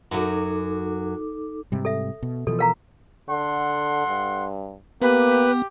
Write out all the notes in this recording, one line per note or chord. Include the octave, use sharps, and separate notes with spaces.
F#2 F#3 D#4 A4 D6
G#2 C3 G3
A4 E5
B2
B2 E3 F3 A4
A#4 F5 A#5
D3 A4 F#5 C6
G2
A#3 B3 G4 B4